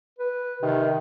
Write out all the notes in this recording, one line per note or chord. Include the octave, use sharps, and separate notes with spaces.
B4
C3 D#3